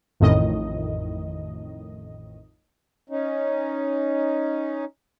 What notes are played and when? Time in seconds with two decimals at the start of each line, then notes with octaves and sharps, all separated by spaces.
0.20 A1 F2 A2 D#3 D#5
3.10 C#4 D#4